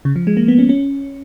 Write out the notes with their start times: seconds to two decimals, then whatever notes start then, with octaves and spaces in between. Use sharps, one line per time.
0.05 C#3
0.16 F3
0.27 G#3
0.37 A#3
0.48 B3
0.59 C#4
0.69 C#4